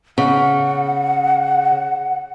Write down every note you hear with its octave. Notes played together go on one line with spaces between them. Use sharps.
C#3 F#5